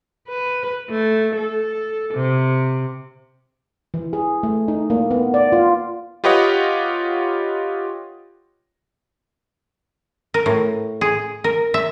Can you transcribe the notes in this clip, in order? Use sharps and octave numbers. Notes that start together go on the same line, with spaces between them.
B4
A3
A4
C3
E3
G#4
A3
D#4
A#3
B3
D5
F4
F4 G4 B4 C#5 D#5 F#5
A#4
A2
G#4
A#4
E5